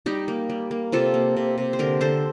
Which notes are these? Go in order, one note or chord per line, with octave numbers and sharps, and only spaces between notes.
G3 D#4 G4
A#3
G3
A#3
C3 F4 A4
A#3
C3
C3
C5
D3 G4 A#4
D3 A4 C5